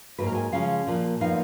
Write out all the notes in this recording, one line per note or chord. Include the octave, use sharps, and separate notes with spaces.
G#2 F#3 A#3 B4
A#4
G#5
C#3 F3 G#3 C#4 F5
A#2 F3 A#3
A#2 F3 B3 D#4 F5